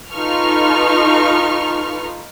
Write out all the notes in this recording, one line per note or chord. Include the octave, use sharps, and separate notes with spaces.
D#4 F4 A4 B4 C#6 F6